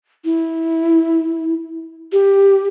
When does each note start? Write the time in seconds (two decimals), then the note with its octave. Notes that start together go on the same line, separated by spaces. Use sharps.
0.25 E4
2.12 G4